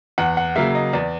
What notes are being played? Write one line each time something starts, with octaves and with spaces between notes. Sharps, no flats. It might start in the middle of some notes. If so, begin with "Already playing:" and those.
E2 F#5
F#5
C#3 F#3 A#3 E5
D#5
E2 D5